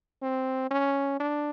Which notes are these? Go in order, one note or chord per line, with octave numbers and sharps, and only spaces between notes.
C4
C#4
D4